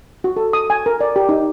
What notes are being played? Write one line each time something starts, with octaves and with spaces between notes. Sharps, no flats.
F#4
A4
D#6
G#5
A#4
D5
G4
D#4